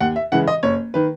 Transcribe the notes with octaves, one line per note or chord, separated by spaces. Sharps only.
D#2 F#5
E5
C#3 E3 G#3 F#5
D#5
F#1 C#5
D#3 B4